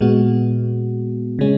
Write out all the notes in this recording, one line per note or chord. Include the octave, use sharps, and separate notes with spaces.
A#2 G#3 B3 F#4
C#3 G#3 C#4